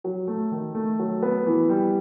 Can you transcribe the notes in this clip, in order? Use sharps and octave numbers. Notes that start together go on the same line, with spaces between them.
F#3
A3
D#3
A3
F#3
B3
E3
G3